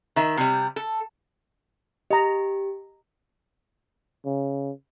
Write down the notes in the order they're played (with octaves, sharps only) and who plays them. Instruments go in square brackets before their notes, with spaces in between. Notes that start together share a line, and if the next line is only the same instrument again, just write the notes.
[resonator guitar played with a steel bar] D#3 E5
C3 G3
A4
[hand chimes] G4 [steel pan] D#5 A#5
[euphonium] C#3